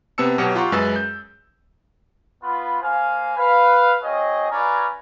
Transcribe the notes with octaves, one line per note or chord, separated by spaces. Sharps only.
C3 B3 C4 A5 E6 C#7
B2 F#3 G4 C#5 F#5 C#7
F4 G4 F#5 A#5 C6 C#6
F#2 G#3 G#4 B4 E6 A6
G6
B3 F4 B5
A#3 C5 F5 G#5
B4 F5
C4 F#4 G#4 C#5 D#5
C#4 F4 G#4 B4 D5 A#5